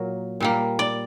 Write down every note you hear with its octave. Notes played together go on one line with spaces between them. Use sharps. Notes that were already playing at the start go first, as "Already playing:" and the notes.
Already playing: A#2 F#3 A#3
A#2 G3 A#3
D5